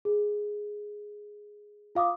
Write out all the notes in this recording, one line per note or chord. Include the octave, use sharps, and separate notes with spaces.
G#4
F4 F5 D6 D#6